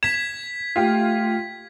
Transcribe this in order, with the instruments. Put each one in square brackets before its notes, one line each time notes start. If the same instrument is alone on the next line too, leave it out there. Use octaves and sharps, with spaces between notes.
[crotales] G#6 B6 [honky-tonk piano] E7
[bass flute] A3 [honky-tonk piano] F4 G4